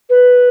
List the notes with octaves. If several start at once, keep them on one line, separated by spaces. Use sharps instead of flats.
B4